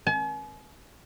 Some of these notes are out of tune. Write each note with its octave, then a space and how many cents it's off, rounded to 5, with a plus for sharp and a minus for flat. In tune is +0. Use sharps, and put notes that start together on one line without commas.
G#5 +45